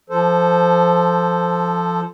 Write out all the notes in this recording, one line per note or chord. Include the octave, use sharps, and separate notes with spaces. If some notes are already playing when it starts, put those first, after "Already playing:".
F3 A4 C5